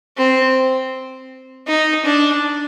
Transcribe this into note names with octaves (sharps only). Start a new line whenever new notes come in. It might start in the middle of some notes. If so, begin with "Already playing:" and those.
C4
D#4
D4